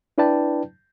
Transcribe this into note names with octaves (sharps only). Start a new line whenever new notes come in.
D4 E4 B4 D5 G5 A5